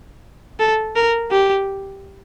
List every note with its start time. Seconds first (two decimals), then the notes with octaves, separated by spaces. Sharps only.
0.60 A4
0.96 A#4
1.31 G4